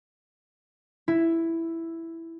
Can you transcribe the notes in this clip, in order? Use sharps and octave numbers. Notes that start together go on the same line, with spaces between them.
E4